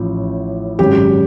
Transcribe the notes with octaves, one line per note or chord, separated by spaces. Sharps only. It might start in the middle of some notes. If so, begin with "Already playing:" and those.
Already playing: A1 A2 F3
G#1 F#2 C#3 G4